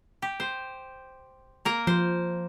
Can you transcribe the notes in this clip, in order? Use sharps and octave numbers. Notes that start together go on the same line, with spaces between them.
G4
C5
A#3 A#4
F3 C5